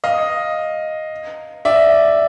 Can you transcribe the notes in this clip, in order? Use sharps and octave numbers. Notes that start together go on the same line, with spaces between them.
D#5 F5
D5 E5